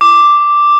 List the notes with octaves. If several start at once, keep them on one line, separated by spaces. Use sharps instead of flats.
D6